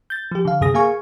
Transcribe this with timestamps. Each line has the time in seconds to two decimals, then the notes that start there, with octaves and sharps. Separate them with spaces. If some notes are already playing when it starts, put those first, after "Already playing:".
0.10 G6 A6
0.32 F3 G4
0.45 D3 F5
0.61 F#2 C3 G#4 D#6 A#6
0.74 A#3 G#4 F5 G#5 C#6